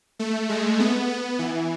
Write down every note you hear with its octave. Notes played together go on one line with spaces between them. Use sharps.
A3
G#3
B3
B3
E3